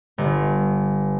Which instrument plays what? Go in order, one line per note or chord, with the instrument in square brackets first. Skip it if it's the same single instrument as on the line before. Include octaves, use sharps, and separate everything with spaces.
[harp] G1